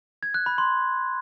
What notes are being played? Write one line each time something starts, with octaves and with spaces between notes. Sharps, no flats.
G#6
F#6
B5
C6